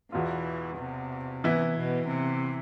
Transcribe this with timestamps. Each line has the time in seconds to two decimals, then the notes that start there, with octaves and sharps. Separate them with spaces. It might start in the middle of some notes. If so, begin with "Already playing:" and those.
0.12 E2 B2 E3 B3 F4
0.78 C3
1.44 E3 B3 E4
1.77 B2
2.09 C3